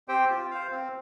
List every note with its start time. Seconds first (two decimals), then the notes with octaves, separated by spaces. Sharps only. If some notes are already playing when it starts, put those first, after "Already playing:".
0.08 C4 G4 C5 G5
0.30 F4
0.51 C5 F5
0.72 C4